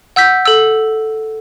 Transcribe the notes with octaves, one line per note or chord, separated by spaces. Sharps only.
F#5 E6 G6 B6
A4 E6